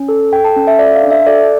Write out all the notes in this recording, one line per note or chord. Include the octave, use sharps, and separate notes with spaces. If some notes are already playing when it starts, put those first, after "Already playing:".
Already playing: C#4
A4
A4 G5
A5
C#4
E5
A4 D5
F5
D4
E5
A4 D5